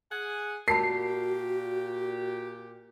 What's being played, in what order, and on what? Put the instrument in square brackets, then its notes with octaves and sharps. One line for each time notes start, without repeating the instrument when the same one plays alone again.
[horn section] G#4 F#5 G#5
[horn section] A#2 G4 [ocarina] F#4 [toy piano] A#4 A5 B5 [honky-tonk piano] C7